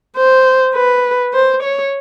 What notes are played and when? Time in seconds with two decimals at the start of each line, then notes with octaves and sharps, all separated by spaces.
0.16 C5
0.75 B4
1.34 C5
1.62 C#5